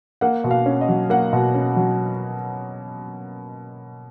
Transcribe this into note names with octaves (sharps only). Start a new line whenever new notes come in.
A#3 F#5
B2
F5
C#4
D#5
F#3
A#3 F#5
B2
C#4
F#3